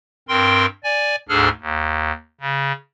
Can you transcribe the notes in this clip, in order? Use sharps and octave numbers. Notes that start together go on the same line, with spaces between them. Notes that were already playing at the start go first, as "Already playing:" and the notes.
G2 C4 A#4 G5 C6
D5 G#5
D2 G#2 D4 G#4 A4 F6
D#2
C#3